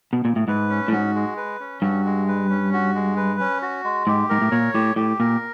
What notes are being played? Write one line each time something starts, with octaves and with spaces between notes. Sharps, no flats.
B2
A#2
A2
G#2 B4
C#4
A2
G#2 F#4
G#3
B4
C#4
G2 F#4
G#3
B4
C#4
F#4
G#3
B4
C#4
F#4
G#3
G#2 G4
G#2 A#4
A2
A#2 C#5
A2 G4
A2 G4
A#2 A#4